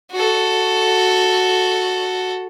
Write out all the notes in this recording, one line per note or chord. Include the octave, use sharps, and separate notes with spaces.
F#4 A4